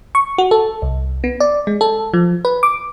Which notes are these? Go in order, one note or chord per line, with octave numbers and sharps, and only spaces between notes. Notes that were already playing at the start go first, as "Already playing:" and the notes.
C#6
F#4
A4
C2
B3
D5
G#3
A4
F3
B4
D6